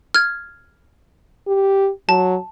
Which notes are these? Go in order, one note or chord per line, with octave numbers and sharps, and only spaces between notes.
F6 G#6
G4
F#3 A5